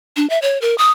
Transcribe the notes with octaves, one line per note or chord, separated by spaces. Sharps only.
D4
E5
C#5
A#4
D#6